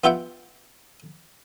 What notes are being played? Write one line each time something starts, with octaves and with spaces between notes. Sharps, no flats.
B3 F4 G4 E5 F#5 G5